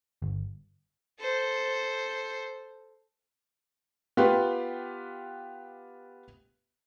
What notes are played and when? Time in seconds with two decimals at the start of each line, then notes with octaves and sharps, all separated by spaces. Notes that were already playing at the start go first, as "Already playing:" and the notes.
0.22 G1
1.19 A4 C5
4.17 B3 F4 G4 B4